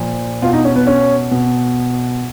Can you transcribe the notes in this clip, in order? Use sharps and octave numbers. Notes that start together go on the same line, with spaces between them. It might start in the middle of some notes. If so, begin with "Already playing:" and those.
Already playing: A#2 F3
B2 F4
D#4
C#4
B3
C#4
B2